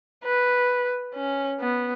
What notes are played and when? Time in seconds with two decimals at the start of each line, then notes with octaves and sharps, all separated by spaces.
0.24 B4
1.15 C#4
1.60 B3